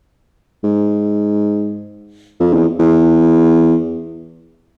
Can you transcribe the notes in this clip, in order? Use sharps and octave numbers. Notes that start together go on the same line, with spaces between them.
G#2
F2
E2
E2